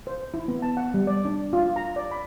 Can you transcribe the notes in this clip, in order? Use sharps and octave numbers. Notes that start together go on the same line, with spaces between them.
C5
E4
B3
A5
F#5
G3
D5
D4
F4
A#5
D5
B5